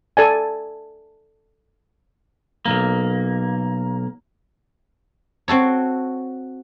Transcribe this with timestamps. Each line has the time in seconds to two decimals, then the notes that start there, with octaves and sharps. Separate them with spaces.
0.17 A4 D5 G#5
2.66 B1 F#2 A#3
5.48 C4 F#4 A4 C#5